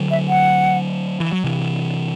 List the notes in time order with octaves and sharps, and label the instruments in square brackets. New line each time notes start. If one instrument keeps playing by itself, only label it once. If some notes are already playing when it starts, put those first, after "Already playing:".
Already playing: [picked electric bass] D3 F#3
[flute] E5
F#5
[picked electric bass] E3
F#3
C3 E3